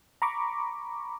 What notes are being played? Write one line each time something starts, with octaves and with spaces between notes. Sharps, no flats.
A#5 B5 C#6 D6